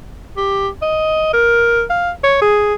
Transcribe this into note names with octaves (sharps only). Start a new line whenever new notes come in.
G4
D#5
A#4
F5
C#5
G#4